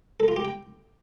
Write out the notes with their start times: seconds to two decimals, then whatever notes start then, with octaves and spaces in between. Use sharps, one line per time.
0.20 A4
0.28 F4
0.36 G4
0.45 G5